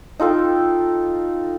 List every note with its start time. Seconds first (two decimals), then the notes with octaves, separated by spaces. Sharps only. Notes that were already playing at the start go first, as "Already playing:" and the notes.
0.20 D#4 F4 A4 G5